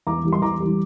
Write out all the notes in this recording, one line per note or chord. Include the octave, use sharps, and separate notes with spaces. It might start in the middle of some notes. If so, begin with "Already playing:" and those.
E2 A#5 D6
E3 G3
C6
E2 A#5 D6
E3 G3